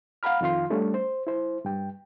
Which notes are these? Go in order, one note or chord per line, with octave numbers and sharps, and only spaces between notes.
F5 F#5 A#5 B5 F6
F2 D#3 F4 F5 C6
G3 A3 C#4 D4
C5
E4 C5
G2 G5